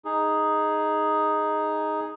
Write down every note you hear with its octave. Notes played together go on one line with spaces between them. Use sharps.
D#4 G#4